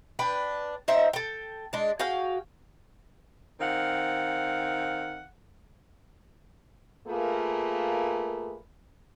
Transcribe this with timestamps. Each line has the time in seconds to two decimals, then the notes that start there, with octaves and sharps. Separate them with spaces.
0.19 D4 B4 G5
0.88 D#4 C5 E5 G5
1.13 A4 G5
1.73 G#3 D4
1.99 F#4 G#4 F5 G5
3.60 D#3 C4 F5 F#5
7.08 A3 A#3 F4 G#4 A#4 B4